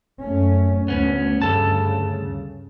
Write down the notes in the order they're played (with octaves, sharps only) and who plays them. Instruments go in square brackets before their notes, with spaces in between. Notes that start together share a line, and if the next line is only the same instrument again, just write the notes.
[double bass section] F#2 A3 C#4
[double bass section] D2 [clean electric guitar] B3 C#4
[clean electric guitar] D2 A4 A5 [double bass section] G2 C#3